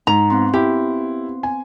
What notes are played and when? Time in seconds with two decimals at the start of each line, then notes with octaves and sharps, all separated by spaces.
0.07 G#2 A#5
0.30 B3 C4 C6
0.54 E4 G4
1.43 G#5